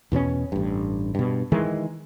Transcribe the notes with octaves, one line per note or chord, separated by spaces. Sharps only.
E2 B2 B3 C#4
A1 G2
G2 B2
D#3 E3 G#3